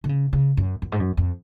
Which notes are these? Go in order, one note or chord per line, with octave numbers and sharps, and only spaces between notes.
D3
C#3
C#3
F#2
F#2
G#2
F#2
F2